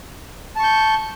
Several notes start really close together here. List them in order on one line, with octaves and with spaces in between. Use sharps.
A5 C#6 G6